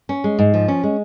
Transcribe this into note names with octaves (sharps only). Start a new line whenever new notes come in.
C#4
G#3
G#2
F3
C#4
G#3